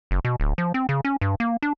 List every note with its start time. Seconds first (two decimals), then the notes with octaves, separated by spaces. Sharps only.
0.11 F#1
0.25 B2
0.40 D1
0.58 F3
0.74 C4
0.89 C#3
1.05 C#4
1.21 G2
1.40 A#3
1.62 D4